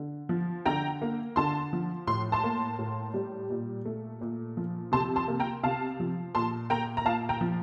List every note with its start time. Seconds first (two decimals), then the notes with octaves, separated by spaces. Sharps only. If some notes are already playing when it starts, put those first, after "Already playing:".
Already playing: D3
0.29 F3
0.66 D3 G5 A#5
1.02 A#3
1.36 D3 A5 C6
1.73 F3
2.07 A2 C6
2.32 A5 C6
2.44 A#3
2.79 A2
3.14 G3
3.50 A#2
3.85 A3
4.21 A#2
4.57 F3
4.92 C3 A5 C6
5.16 A5 C6
5.28 A#3
5.40 G5 A#5
5.63 C3 F5 A5
6.00 F3
6.35 A#2 A5 C6
6.70 A#3 G5 A#5
6.97 A#5
7.05 A#2 F5 A5
7.29 G5 A#5
7.41 F3